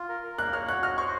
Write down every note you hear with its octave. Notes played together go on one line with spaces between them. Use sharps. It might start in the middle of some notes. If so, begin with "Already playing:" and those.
Already playing: F4
A#4
A#4
A#3 F#6
C#5 F6
F#4 F#6
D#5 F6
C5 C#6